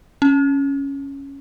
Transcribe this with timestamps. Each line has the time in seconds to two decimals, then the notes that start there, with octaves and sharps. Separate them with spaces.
0.22 C#4